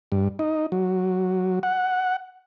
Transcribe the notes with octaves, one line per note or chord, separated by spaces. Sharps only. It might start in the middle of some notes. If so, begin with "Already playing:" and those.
G2
D#4
F#3
F#5